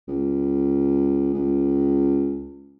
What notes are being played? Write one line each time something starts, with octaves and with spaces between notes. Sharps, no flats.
C#2
C#2